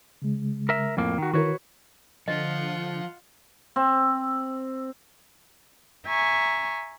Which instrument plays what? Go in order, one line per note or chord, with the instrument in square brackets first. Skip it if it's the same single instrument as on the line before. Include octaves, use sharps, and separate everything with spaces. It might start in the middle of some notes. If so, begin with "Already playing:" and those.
[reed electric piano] C#3 G#3
[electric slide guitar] A#4 E5
F2 A2 A#3
D#3 F#4
[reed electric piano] D#3 E4 A#4 [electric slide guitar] F#4 B4 C#5
[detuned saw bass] D3 [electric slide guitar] F3 [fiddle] F4 F#5 [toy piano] D#5
[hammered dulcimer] C4
[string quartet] E5 G#5 A#5 C#6